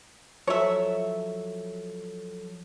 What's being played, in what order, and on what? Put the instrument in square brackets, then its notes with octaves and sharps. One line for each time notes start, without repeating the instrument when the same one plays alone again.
[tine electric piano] F3 F#3 A4 [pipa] C#5 E5